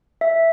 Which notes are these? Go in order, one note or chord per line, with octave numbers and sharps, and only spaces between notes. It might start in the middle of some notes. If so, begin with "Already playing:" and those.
E5